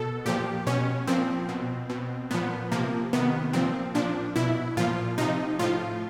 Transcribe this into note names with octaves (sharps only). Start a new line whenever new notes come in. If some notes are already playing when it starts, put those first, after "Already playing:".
Already playing: B2 A4
A#2 F3 G4
B2 C#4
A#2 F3 C4
B2
B2
A#2 F3 B3
C3 F3 A#3
C3 D#3 B3
A#2 F3 C4
A#2 F3 D4
B2 E4
A#2 F3 F4
C3 F3 D#4
A2 F3 F4